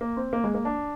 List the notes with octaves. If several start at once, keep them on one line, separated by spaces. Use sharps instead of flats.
A#3
C4
A#3
G#3
A#3
D4